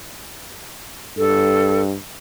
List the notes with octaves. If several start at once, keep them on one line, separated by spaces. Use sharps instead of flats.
G2 A4